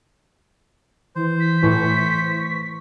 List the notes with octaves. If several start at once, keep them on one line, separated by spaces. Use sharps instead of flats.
E3 C5
B6
A2 E3 C#6